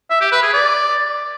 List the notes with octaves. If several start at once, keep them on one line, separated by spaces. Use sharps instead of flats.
E5
G4
B4
G#4
D5